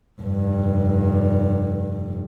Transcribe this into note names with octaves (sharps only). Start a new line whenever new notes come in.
F1 G2